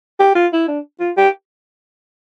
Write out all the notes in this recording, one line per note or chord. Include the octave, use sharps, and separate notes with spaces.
G4
F4
E4
D4
F4
G4